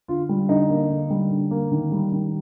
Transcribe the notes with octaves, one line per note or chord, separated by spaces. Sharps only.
D3 F4
G3
D3 D#4
A#3
D3
G3
D3
A#3
D#3
G3
D#3